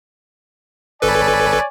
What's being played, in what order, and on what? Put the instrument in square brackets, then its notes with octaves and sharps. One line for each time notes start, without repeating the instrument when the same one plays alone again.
[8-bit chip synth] G#1 A4 B4 [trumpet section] C#5 D5 G#5